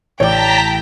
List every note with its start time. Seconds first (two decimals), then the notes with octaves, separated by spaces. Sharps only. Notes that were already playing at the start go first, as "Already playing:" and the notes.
0.20 A1 C#5 D5 G5 A5 A#5 B6